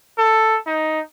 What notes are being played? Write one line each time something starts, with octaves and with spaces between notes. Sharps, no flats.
A4
D#4